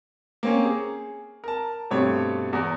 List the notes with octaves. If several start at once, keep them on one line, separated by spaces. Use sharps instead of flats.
A#3 C4 C#4
G#4
A#4 A5
G2 B2 A3 C4 C#5
E2 A#5